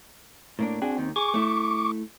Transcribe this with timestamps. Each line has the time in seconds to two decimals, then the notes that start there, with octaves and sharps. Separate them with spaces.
0.59 A2 A#3 D4
0.82 C4 D4 F#4 G#4
0.98 D#2 D#3
1.16 G#4 C#6 D6
1.34 A3 E4